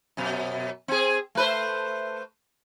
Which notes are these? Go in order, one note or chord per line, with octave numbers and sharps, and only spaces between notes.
F#2 B2
C4 G#4
A3 B4 C5